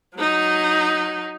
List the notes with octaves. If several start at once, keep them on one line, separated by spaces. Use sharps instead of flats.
F#3 D#4